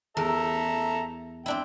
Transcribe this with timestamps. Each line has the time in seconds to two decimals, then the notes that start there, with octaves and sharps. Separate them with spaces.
0.17 E2 A4 A#4 E5 A#5
1.46 C4 D4 E4 G5